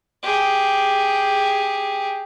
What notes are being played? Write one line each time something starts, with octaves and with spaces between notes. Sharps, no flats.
G4 G#4